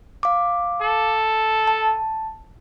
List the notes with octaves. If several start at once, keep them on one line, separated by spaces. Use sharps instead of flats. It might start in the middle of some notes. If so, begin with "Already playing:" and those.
F5 D6
A4
A5